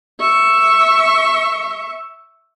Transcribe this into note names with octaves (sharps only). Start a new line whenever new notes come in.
E5 C#6